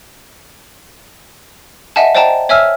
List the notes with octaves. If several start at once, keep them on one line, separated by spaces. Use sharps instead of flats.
D#5 E5 F#5 G#5 A5
C5 D5 D#5 G5 A5 A#5
C#5 E5 G#5 E6 F6